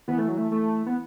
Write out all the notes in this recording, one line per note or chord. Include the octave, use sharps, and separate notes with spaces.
E3 B3
A3
F#3
A3
A3
B3